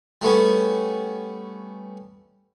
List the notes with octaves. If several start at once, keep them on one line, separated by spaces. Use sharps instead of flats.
G3 A3 B3 C#4